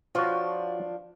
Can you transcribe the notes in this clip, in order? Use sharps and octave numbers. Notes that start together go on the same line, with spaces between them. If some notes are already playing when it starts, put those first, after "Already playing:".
F3 D4 F4 F#4 B4 C#5